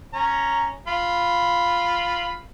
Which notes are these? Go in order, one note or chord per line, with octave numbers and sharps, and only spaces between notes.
C#4 A#5
F4 B5